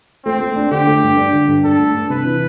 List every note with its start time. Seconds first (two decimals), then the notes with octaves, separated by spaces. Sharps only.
0.25 A3 C4
0.41 A3
0.56 D4
0.71 D3 G4
0.87 A3
1.03 G2
1.17 D4
1.33 D3
1.48 G2
1.64 D4 A4
1.79 A3
1.94 G2
2.10 C3 B4
2.25 E3